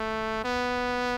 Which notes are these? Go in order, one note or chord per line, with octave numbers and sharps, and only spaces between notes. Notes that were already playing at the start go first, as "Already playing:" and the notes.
Already playing: A3
B3